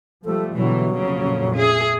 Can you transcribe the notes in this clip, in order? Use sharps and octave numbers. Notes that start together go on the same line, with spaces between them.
F3 G3 A3 A4
B2 D3 E3 F#3 G3
F2 A#2 C#3
G#4 E5